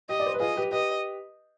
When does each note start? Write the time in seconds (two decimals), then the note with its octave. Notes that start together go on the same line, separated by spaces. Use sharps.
0.09 G4 D#5
0.20 D5
0.26 C5
0.34 B4
0.40 F4 G#4 D#5
0.56 G4 B4
0.71 G4 B4 D#5